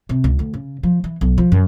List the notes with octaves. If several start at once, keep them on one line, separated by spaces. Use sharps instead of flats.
C3
C#2
D2
C#3
F3
E3
B1
F3
F#2